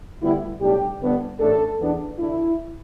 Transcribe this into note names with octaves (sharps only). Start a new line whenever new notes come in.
D2 D3 G3 B3 E4
B1 A2 G3 D4 G4
G1 G2 D3 B3 D4
A1 A2 A3 D4 A4
E2 E3 B3 D4
D2 D3 A3 D4 E4